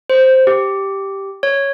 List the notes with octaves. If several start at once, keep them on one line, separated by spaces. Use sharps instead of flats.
C5
G4
C#5